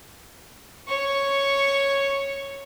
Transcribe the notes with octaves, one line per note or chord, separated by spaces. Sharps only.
C#5 C#6